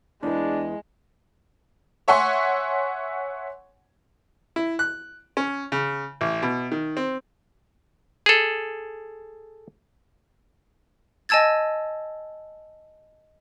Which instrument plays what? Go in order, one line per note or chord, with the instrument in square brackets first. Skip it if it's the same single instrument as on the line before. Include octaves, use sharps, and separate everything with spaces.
[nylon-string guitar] E2 B4 [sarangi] G#3 [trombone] D4
[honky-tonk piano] C#5 E5 F#5 G#5 C6 C#6
[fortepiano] E4
F#6
C#4
C#3
A1
B2
D#3
C4
[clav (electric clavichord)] G#4 A4
[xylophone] D#5 G#5 A5 E6 G#6 A6